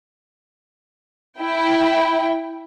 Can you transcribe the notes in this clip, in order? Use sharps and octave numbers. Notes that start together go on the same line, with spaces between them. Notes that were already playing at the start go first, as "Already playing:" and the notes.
E4 G5